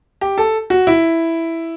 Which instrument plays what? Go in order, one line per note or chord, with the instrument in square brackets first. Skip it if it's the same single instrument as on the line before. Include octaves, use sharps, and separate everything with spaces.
[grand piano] G4
A4
F#4
E4